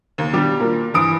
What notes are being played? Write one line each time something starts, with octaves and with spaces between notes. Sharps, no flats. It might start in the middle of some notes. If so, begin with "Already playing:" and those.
D#2
B2 G3 D4 G4
A#2 A#4
G2 E3 D#6 D7